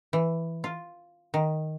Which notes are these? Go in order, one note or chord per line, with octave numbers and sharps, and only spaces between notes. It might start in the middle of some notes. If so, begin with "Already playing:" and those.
E3
F4
D#3